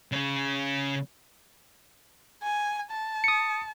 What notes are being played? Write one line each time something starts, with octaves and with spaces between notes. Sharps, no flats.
C#3 C#4
G#5
A5
D#6 C#7